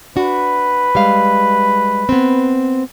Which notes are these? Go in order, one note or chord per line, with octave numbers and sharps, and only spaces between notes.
D4 F#4 B4
G3 G#3 F5
B3 C4